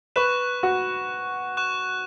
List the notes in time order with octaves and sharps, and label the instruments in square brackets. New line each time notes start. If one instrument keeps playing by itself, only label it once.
[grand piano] B4 [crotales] C#6 F#6 E7
[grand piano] F#4
[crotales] C#6 F#6 E7